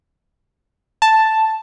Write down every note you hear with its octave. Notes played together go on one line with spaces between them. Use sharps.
A5